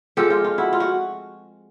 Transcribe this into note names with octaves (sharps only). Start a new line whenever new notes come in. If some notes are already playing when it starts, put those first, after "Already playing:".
F3 G#3 C4 G4 A4
F4
F4
E4 F#4
F4
F#4